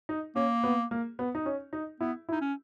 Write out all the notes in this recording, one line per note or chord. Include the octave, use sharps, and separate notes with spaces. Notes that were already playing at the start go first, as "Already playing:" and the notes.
D#4
A#3 C#4
B3
A#3
B3
D#4
C#4
D#4
B3 E4
E4
D#4
C#4